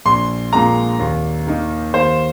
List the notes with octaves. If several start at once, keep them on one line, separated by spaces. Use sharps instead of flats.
A#1 C6
A#2 G#3 A#5
D#2
D#3 A#3 D#4
D#2 C5